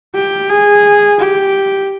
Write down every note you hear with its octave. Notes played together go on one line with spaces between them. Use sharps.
G4
G#4
G4